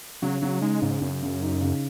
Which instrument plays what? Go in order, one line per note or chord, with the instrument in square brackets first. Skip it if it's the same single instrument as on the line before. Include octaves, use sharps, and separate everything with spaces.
[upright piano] C#3 [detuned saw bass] F#3
[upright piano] C#3 [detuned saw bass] F#3
[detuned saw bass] G#3 [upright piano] D#4
[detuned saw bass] G#2 [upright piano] C#3
[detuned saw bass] F#2 [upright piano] C#3
[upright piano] C#3
D#4
C#3